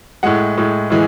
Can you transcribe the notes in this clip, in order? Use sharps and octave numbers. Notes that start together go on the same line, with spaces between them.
A2 G#3 F#5
A2 G#3
A2 E3 G#3